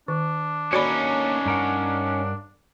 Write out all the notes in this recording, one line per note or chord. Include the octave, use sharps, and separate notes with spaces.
D#3 D4
A#3 C#4 D#4 F#4 A4 C#5 D5 B5
G2 A#4 F#5